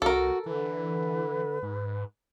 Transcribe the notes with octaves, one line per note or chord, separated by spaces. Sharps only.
C2 F#4 A4 A#4
D3 E3 B4
G#2